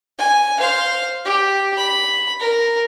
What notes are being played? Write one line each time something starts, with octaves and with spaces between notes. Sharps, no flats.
G#5
C5 F5
G4
B5
A#4